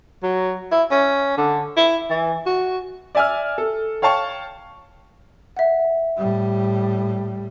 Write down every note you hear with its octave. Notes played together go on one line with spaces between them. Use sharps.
F#3
E4
C#4
D3
E4
E3
F#4
D5 E5 G#5 E6 F6
A4
C#5 F5 G5 A5 C#6
E5 F#5
A2 G3